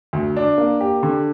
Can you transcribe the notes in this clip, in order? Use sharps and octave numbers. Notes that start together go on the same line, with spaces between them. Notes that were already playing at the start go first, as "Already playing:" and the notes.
D2
D4
A#3
G4
D3